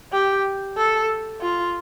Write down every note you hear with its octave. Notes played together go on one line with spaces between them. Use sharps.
G4
A4
F4